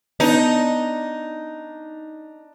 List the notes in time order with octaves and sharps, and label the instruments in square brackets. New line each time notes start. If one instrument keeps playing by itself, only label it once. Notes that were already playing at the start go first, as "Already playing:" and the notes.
[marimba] B3 B4 [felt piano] D4 D5 [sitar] D#4